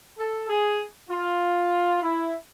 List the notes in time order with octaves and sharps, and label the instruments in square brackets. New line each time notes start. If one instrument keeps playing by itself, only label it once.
[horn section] A4
G#4
F4
E4